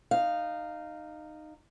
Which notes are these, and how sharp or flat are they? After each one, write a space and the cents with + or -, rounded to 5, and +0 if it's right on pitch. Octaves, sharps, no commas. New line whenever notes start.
D#4 -15 F5 +0